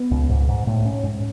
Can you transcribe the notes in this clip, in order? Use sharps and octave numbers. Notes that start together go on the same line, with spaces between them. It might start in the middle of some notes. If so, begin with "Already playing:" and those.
Already playing: B3
C#2
G#2
G#2
A2
C#4
G#2